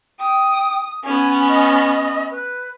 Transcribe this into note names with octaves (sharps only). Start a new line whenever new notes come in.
G5 D#6
B3 C#4 G#5
D#5
B4